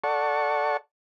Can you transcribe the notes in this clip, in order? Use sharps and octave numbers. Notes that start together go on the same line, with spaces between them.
A4 D5 F#5 A5 C#6